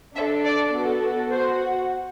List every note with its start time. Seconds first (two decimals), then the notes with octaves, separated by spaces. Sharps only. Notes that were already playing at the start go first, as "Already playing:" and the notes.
0.16 D4 E5
0.21 A4
0.44 D5
0.74 B3 F#4 A4
1.30 F#4 C5